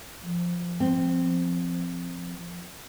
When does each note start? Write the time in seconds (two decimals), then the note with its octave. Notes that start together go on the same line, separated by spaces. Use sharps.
0.23 F3
0.80 C4